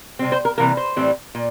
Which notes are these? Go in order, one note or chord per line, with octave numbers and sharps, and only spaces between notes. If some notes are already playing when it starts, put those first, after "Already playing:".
C3 G3 C4
C5
A#4
C3 E3 G3 A#3 A#4
C5
A2 E3 G3 C4
A#2